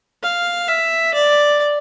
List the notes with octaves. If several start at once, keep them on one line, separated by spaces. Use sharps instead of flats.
F5
E5
D5